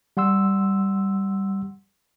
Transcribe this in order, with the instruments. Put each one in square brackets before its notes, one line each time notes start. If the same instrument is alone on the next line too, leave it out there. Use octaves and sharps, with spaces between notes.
[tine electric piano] G3 F#5 C6 E6